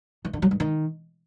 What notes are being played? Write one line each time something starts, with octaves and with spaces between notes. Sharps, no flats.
E3
D3
F#3
G2
D#3